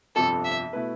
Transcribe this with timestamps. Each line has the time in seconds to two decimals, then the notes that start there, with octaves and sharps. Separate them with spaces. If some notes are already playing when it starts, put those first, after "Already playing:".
0.16 G1 F2 C3 F3 C4 A4
0.45 E5
0.73 B2 A3 E4 B4